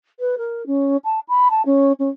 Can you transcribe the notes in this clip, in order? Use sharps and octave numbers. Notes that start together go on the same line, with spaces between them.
B4
A#4
C#4
A5
B5
A5
C#4
C#4